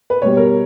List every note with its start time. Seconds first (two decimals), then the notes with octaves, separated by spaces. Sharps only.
0.10 B4
0.22 B2 G3 C#5
0.37 A#4